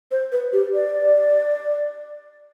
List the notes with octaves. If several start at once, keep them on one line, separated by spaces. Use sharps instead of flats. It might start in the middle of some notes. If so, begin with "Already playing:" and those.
C5
B4
G4
D5